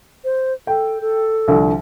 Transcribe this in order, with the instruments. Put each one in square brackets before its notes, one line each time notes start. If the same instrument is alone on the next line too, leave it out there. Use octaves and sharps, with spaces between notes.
[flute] C5
[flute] A4 [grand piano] G5
[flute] A4
[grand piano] C2 D3 F3